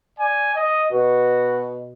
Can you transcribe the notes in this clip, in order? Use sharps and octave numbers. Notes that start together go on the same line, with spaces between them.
D5 G#5
D#5
B2 F#4